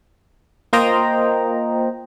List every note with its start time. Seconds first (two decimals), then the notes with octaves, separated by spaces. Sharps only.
0.73 A#3 F4 C5 D#5 G5 A#5